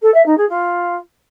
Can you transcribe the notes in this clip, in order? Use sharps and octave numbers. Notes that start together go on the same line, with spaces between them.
A4
E5
D#4
G#4
F4